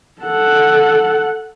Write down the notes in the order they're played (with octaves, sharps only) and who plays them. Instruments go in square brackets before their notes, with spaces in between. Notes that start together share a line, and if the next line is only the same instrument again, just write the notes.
[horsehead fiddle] A4 F#5